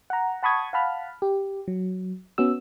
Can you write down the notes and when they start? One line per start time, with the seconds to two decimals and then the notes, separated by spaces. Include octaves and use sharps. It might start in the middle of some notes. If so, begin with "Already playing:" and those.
0.10 F#5 A#5
0.43 F#5 A5 B5 C#6 D#6 G#6
0.73 F5 F#5 A5 B5 F6
1.22 G4
1.68 F#3
2.38 B3 C#4 F#4 E6